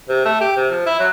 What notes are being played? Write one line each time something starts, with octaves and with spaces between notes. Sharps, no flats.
C3
A3
G4
C3
F3
E4
F#3